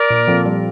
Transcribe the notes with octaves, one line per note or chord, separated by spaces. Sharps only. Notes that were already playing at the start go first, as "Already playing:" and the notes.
Already playing: A#4 D5
A#2
F3 C4 F4 A4
G3